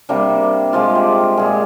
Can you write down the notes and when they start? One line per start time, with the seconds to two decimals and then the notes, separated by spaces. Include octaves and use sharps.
0.09 C3 G3 A#3 D4
0.73 C3 F3 G#3 F4
0.95 G4
1.37 A#2 G#3 G#4